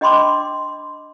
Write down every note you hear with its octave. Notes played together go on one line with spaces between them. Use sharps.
D4 D#5 G5 B5 C6 D6